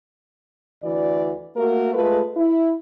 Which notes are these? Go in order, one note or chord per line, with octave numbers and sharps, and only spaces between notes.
D2 E3 F#4 D5
A3 A#3 F#4 A#4
G#3 A3 F4 B4
E4